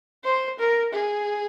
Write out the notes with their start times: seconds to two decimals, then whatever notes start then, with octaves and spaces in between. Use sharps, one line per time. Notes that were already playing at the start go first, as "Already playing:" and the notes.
0.24 C5
0.59 A#4
0.93 G#4